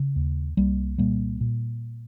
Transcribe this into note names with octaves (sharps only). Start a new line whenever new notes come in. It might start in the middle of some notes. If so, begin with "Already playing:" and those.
Already playing: C#3
D#2
C2 G3 A#3
A#2 G3 A#3
A#2